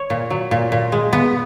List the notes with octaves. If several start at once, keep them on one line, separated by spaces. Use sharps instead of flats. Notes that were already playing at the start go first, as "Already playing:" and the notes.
Already playing: C#5
A#2
F#3
A#2
A#2
G#3
B3